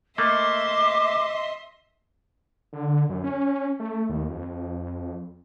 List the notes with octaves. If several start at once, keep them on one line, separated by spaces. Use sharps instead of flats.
A3 A#3 D#5 E5 C6 D6
D3
D3
F#2
C#4
A3
D#2
F2